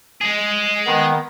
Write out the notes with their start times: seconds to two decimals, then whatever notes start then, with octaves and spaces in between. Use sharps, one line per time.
0.21 G#3 G#4
0.87 D#3 B3